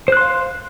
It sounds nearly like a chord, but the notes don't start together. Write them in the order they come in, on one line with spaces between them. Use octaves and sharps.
C5 F#6 C6 F5